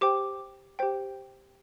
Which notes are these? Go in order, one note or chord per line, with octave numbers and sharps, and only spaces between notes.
G4 C5 G5 D6
G4 C5 G5